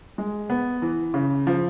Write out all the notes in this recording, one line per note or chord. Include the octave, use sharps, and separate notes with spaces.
G#3
B3
E3
C#3
F3